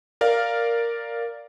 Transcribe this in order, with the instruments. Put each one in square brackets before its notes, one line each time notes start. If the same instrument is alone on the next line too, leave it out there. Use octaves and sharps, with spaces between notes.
[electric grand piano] A#4 D5 F5